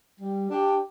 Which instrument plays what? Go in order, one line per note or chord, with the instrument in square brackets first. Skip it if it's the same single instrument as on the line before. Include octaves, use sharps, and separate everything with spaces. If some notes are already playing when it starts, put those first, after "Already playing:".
[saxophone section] G3
D4 G4